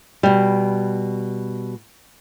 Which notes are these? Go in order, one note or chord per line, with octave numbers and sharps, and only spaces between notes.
B2 G3